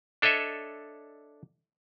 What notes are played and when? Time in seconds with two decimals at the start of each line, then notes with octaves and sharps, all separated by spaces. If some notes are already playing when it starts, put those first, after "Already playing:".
0.22 D4 A4 C#5 D#5 E5